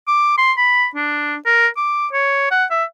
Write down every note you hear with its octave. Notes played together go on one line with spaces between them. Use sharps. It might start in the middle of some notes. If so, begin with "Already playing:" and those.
D6
C6
B5
D4
A#4
D6
C#5
F#5
E5